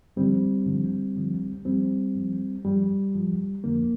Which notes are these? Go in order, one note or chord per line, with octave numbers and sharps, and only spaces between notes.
G2 D3 F3 G3 C4
G2 D3 F3
G2 D3 F3
G2 F3 G3 C4
G2 F3
G2 F3 G3
G2 F3
F2 D3 F3 A#3